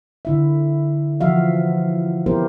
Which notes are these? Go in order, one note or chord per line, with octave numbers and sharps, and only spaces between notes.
D3 E4 E5
E3 F3 F#4 E5 F5
B3 E4 G4 A#4 C5